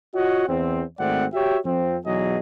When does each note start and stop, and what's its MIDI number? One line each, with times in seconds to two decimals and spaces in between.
0.15 0.48 65
0.15 0.48 66
0.15 0.48 73
0.15 0.48 75
0.15 0.48 78
0.48 0.82 40
0.48 0.82 60
1.00 1.25 32
1.00 1.25 57
1.00 1.25 60
1.00 1.25 74
1.00 1.25 78
1.33 1.58 66
1.33 1.58 67
1.33 1.58 73
1.33 1.58 76
1.33 1.58 79
1.65 1.97 41
1.65 1.97 53
1.65 1.97 60
2.05 2.39 35
2.05 2.39 40
2.05 2.39 54
2.05 2.39 68
2.05 2.39 75